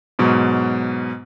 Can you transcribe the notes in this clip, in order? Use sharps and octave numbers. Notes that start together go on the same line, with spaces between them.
G#2 B2 F#3